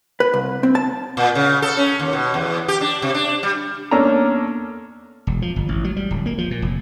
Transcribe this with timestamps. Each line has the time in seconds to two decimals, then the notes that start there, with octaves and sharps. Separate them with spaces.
0.20 B4
0.34 C2
0.63 C4
0.75 A5
1.17 A#2
1.35 C#3
1.62 A4
1.77 C#4
2.00 D#2
2.13 B2
2.34 E2
2.68 G4
2.81 D4
3.02 C3
3.14 D4
3.43 G3
3.91 E2 A#3 C#4 D4 A4 A#5
5.27 E1
5.42 F3
5.56 G1
5.69 A1
5.84 F#3
5.97 G3
6.11 D1
6.26 A#3
6.38 F3
6.51 A#2
6.62 F1